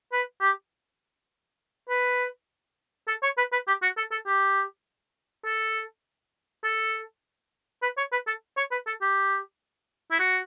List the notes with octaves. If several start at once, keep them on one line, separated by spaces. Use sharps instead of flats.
B4
G4
B4
A4
C#5
B4
B4
G4
F#4
A4
A4
G4
A4
A4
B4
C#5
B4
A4
C#5
B4
A4
G4
E4
F#4